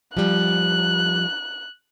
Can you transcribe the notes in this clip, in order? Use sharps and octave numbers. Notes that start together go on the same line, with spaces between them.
F3 G3 F#6